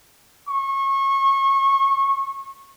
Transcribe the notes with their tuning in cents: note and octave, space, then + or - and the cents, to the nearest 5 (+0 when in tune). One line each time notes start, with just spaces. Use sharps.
C#6 -25